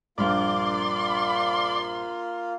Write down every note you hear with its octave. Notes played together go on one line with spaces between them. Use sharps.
A#1 G2 A#3 F4 D5 C6 F6